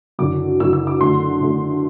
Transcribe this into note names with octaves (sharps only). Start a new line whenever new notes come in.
F#1 F#2 D3 F#3 D6
F#1 F#2 D3 F#3 E6
E6
D6
F#2 D3 A3 C6
F#2 D3 A3